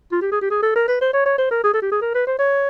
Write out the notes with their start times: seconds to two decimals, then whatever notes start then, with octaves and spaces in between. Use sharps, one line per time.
0.12 F4
0.21 G4
0.32 G#4
0.41 G4
0.51 G#4
0.62 A4
0.76 A#4
0.88 B4
1.01 C5
1.13 C#5
1.26 C#5
1.38 C5
1.51 A#4
1.64 G#4
1.74 A4
1.82 G4
1.91 G#4
2.01 A#4
2.15 B4
2.27 C5
2.39 C#5